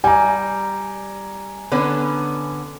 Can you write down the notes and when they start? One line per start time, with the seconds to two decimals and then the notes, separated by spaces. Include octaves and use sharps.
0.04 G3 G#5 A#5
1.72 D3 B3 C#4